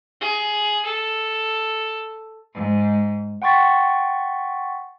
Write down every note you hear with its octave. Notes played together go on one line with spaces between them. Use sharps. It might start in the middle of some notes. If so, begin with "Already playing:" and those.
G#4
A4
G#2
F#5 G5 C6 C#6 A6 B6